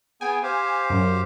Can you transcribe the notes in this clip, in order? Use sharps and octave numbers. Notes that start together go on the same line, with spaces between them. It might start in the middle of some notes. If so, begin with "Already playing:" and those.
B3 G#4 G5 G#5
G4 C5 F5
F#2